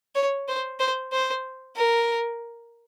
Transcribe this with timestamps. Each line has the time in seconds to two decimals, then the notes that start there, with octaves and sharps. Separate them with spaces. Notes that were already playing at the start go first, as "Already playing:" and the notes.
0.15 C#5
0.48 C5
0.80 C5
1.12 C5
1.76 A#4